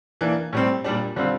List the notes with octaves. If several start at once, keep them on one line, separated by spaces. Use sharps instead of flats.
E3 A#3 D4
A2 G3 C4
A#2 G3 D4
D3 G3 C4 F4